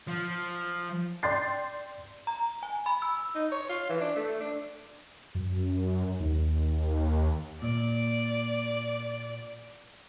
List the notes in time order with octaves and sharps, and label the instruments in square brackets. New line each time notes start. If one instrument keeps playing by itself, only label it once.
[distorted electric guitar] F3
[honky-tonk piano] D5 G5 C6 G6 A6 C7
[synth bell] A#5
G#5
B5
E6
[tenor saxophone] D#4
C#5
F4
E3
D4
A3
D4
[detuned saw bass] F#2
D#2
[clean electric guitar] A#2 [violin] D5